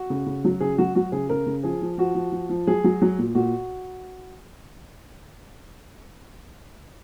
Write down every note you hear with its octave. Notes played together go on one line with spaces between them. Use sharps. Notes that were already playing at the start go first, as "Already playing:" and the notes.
Already playing: F#4
C#3
C#3
F#3
C#3 G#4
F#3 F#4
F#3 F#4
C#3 G#4
C#3 A#4
C#3
F3 G#4
F3
F3 F#4
F3
F3
F3
F#3 G#4
F#3
F#3
A#2
A#2 F#4